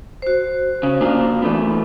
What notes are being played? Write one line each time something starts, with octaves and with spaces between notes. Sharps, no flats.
F#4 C5
C#3
A#3 D4 F4
E3 A3 B3